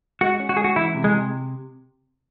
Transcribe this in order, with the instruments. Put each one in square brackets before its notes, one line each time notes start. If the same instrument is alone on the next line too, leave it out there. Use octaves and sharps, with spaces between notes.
[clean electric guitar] G#3 [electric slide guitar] F#4
[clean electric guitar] C#4
[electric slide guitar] F#4
[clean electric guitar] G#3 [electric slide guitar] G#4
[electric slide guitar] F#4
[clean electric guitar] E3 [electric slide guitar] E4
[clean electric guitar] C3
[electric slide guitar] G#3
[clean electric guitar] C3